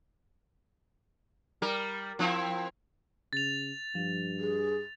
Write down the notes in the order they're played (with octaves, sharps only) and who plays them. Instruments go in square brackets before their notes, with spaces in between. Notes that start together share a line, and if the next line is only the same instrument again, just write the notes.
[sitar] G3 A#4
F3 C4 E4
[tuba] C#3 [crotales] A6 F7
[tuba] G2 [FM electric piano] F3
[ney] G#4